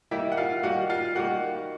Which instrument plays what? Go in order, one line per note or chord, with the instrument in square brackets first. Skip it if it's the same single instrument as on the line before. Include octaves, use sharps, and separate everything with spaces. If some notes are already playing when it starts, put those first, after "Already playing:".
[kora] D#3 G3 A#3 [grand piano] E4 E5
[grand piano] F#5
F4 F5
[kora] D#3 G3 A#3 [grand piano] F#4 F#5
[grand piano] F4 F5
[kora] D#3 G3 A#3 [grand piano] F#4 F#5